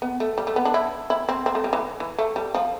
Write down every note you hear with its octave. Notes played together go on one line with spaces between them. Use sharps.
B3
A3
G3
A3
B3
D4
E4
E4
C4
C4
A3
G3
E3
E3
A3
G3
F3